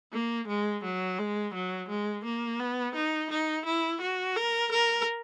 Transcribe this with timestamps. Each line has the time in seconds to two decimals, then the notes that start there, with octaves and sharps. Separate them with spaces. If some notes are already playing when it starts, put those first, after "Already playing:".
0.13 A#3
0.48 G#3
0.84 F#3
1.19 G#3
1.55 F#3
1.89 G#3
2.25 A#3
2.59 B3
2.95 D#4
3.30 D#4
3.66 E4
4.01 F#4
4.36 A#4
4.72 A#4